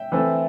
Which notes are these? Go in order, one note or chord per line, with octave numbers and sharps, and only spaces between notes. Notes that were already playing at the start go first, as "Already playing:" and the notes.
Already playing: E5 G5
E3 A3 C4